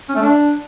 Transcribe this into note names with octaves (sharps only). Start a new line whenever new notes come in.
C#4
A3
D4